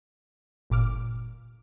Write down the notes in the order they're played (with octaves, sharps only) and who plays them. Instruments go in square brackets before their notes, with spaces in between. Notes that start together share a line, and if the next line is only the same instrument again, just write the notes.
[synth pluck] G1 A#2 D6 F6